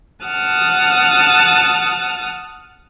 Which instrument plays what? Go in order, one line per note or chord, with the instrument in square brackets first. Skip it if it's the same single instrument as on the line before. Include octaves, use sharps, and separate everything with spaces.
[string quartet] F#5 A5 D#6 F6